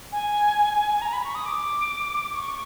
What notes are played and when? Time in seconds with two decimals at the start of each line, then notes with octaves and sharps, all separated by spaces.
0.12 G#5
1.02 A#5
1.13 B5
1.24 C#6
1.35 D#6
1.46 D6
2.35 C#6